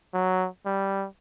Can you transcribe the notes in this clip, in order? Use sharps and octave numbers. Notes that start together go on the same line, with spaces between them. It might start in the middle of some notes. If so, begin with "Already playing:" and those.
F#3
G3